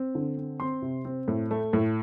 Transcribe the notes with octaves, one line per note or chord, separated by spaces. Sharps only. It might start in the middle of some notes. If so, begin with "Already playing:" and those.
Already playing: C4
D3
C4
C4 C6
C3
C4
A2
A3
A2